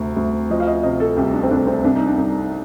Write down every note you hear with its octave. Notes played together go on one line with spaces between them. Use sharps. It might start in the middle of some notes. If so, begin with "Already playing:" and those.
Already playing: D2 C3
D2
F3 D#5
F5
D#5
C3 D#5
A4
C2 G4
D4
C4
C2 D4
C4
C2 D4
D#4
D4
C2